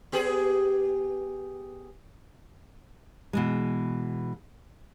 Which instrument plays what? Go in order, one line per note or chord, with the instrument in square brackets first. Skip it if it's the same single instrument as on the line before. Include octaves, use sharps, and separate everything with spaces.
[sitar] B3 G4 G#4
[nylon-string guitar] B2 E3 G#3